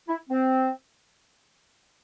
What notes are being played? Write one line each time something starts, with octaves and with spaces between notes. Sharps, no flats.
E4
C4